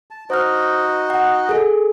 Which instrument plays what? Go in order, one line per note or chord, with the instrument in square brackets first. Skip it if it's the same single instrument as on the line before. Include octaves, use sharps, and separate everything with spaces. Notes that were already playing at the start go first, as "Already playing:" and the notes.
[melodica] A5
[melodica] D#4 F#4 D#5 [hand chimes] C5 F6
[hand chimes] F#5
G#4 A4